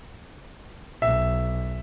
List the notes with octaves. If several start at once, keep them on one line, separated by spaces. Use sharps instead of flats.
B1 E5